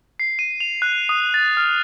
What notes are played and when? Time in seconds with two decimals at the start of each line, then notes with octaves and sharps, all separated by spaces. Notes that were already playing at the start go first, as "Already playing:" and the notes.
0.20 C7
0.39 D#7
0.60 F7
0.82 F#6
1.09 D#6
1.34 A6
1.57 F6